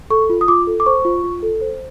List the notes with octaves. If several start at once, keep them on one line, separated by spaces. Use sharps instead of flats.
A4 C#6
F4
D#6
F4 D6
A4
D6
C5 C#6
F4
F4
A4
C5